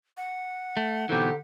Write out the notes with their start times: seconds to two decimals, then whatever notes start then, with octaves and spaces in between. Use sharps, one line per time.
0.17 F#5
0.77 A3
1.09 B2 D3 E3 C4 D#4 G4